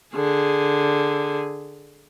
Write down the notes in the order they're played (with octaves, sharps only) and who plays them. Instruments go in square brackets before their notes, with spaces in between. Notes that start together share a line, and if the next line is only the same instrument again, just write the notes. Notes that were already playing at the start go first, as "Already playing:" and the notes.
[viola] D3 G#4